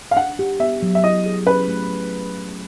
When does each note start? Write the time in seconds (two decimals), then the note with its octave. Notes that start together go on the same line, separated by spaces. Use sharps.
0.11 F5
0.16 D4 F#5
0.39 G4
0.60 B3 E5
0.82 F#3
0.95 E5
1.04 E4 D#5
1.26 G#4
1.46 C#4 B4
1.68 A3